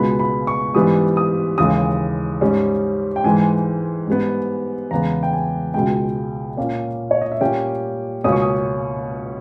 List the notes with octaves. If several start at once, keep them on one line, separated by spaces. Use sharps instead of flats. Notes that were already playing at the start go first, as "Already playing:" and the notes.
Already playing: C#2 B2 G#3 B3 B5
B5
C#6
G#2 E3 G3 B3 D#6
D#6
D#2 C#3 E3 G#3 D#6
G#2 G3 C#4
G5
G#2 E3 G#3 G#5
G#2 G3 B3
E2 C#3 G#3 B3 A#5
G5
G#5
C#2 B2 G#3 G5
A#2 A#3 C#4
C#5
D#5
E5
A#2 G3 A#3 C#4 G5
C#2 B2 A#3 C#4 D#6
C#6
D#6